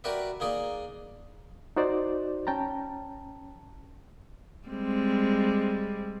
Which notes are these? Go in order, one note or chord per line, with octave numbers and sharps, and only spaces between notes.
F#4 G4 A#4 B4 D5 E5
A#3 D#4 G#4 D5
D#4 F#4 C5 D5
C#4 G5 A5 A#5
G3 G#3 C4